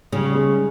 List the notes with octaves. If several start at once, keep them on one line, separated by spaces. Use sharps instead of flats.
C#3 G3
G#3